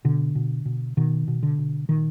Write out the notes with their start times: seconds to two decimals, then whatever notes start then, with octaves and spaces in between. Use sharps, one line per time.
0.05 B2 D3
0.35 B2
0.65 B2
0.97 B2 D#3
1.28 B2
1.43 D3
1.58 B2
1.89 A#2 D#3